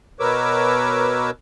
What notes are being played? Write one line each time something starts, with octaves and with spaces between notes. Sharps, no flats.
B2 A#4 B4 C#5 D6 E6